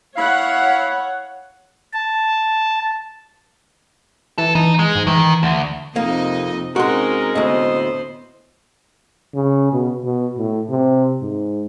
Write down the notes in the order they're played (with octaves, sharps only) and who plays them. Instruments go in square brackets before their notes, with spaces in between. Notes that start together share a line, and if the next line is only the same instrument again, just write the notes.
[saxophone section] E4 F5 [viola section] C#5 F#5
[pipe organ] A5
[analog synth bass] E3 [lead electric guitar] A4
[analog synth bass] E3 [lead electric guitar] D#4
[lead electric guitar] G#3
[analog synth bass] G#2
[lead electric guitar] D#3 [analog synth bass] E3
[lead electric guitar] D2
[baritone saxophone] F2 [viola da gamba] C3 D#4 D#5 [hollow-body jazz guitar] A#3
[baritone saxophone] G#3 [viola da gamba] C4 C#4 D#4 [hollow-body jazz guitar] F#4 C6 [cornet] A#4
[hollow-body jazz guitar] D2 A2 [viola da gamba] B3 C5 [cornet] D#5
[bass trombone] C#3
B2
B2
A2
C3
G#2